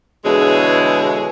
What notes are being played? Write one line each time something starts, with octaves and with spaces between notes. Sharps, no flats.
B2 D3 E3 G#3 G#4 C#5